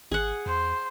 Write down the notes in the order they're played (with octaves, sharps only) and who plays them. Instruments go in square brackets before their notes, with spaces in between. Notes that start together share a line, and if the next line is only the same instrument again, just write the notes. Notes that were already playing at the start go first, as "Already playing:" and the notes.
[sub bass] G#1 [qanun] G#4 F#5
[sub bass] E2 [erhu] C5